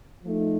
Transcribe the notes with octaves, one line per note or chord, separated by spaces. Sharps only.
F3 A3 D#4